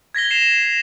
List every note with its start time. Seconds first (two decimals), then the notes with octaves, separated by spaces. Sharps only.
0.15 G#6 A#6 B6 G7
0.31 C7 E7 F7